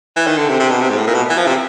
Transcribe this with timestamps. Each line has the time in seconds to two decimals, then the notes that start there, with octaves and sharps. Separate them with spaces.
0.16 E3
0.27 D#3
0.38 D3
0.49 C3
0.60 C3
0.71 B2
0.81 C3
0.90 G#2
0.97 A2
1.06 A#2
1.15 B2
1.30 E3
1.38 F3
1.47 C3